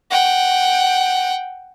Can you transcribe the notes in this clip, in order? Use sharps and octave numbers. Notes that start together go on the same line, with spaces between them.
F#5 G5